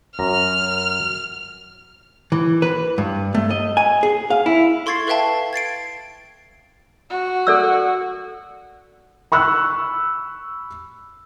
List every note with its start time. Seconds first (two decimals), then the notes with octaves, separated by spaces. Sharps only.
0.19 F#2 A#5 F6
2.32 E3
2.62 B4
2.98 G2
3.35 A3
3.50 D#5
3.77 G#5
4.03 G#4
4.30 F5
4.46 E4
4.86 A4 C6 C#6 G#6 A6 C7
5.07 A4 B4 E5 F5 G5 A5
5.53 G#6 A6 C7 D7
7.10 F#4
7.47 A4 D5 E6
9.32 B5 C#6 E6 F#6